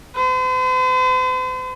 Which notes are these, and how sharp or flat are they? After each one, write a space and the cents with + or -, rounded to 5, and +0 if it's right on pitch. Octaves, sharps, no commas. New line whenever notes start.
C5 -45